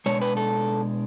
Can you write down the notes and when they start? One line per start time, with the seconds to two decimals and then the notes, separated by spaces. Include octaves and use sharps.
0.06 B2 G#3 D4 C#5
0.22 B4
0.37 A4